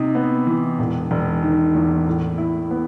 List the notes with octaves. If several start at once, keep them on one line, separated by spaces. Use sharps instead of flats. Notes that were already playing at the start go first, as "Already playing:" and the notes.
Already playing: C3 D#4
B3
E3
E1
E1
D#3
E2
A2
E4
B3